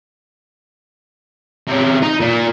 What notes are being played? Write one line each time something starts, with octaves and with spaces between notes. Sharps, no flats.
C3 C#4
D#4
A#2